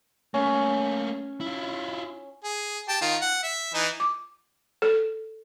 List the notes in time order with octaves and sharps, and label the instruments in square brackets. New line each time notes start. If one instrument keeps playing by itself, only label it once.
[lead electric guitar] A3 A#3 [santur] C#4
[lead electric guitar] E4 F4
[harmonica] G#4
G4 A5
D#3 F4
F#5
E5
E3 D#4
[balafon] D6
A4